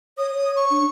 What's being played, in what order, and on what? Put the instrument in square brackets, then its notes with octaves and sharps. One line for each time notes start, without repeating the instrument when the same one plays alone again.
[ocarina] C#5 [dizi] D#6
[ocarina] C#5
[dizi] C#6
[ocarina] D4